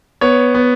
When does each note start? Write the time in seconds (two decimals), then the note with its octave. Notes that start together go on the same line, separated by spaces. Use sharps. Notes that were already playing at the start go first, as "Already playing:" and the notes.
0.21 B3 C#5
0.54 B3